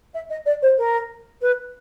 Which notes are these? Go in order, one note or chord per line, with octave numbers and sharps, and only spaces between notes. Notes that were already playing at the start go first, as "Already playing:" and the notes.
E5
D#5
D5
C5
A#4
B4